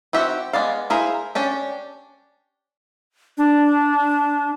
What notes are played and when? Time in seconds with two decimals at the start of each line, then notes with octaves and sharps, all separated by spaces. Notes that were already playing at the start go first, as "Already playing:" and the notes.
0.13 C4 F#4 G4 E5 F#5
0.53 G#3 B3 D5 F5
0.90 E4 G#4 A#4 C5 F5
1.35 C#4 D4 G4
3.38 D4